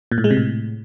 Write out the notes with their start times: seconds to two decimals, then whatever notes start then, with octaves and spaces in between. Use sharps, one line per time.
0.12 A#2
0.18 A2
0.24 G#3
0.31 C3
0.37 A2